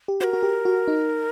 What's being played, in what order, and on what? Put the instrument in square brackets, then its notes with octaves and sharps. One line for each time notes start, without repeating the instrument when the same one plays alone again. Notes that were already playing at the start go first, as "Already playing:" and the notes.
[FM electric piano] G4
[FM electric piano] F#4 [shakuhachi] A#4 C5
[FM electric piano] F#4
G4
F#4
D#4